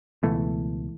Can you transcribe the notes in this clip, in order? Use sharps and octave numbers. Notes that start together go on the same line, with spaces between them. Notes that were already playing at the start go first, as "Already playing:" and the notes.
C#2 B2 E3 A3